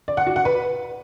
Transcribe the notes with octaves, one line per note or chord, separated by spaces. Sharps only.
D5
F#5
F#4
F#5
B4